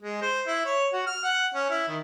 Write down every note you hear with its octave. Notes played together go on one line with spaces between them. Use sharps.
G#3
C5
E4
C#5
F#4
F6
F#5
C#4
E4
D#3